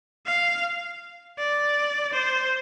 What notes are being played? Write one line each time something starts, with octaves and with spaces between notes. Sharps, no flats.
F5
D5
C5